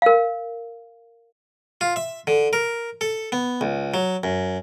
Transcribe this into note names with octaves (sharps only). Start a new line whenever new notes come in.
A#4 F5
F4
E5
D3
A#4
A4
B3
C#2
F#3
F#2